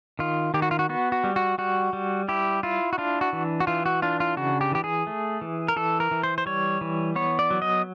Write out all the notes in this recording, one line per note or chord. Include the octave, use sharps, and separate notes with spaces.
D#3 F4
D#3 G4
F#4
F4
F#4
B3 F#4
F#4
G3
F#4
G3 F#4
G3
E4 G4
E4 F4
F#4
D4 F4
F#4
E3
F#4
E3 F4
F#4
D4 F4
F4
C#3 F#4
G4
E3 G4
G#4
A3
E3
A#4
E3 A4
A#4
E3
C5
C5
G3 C#5
E3
B3 C#5
D5
F#3
D#5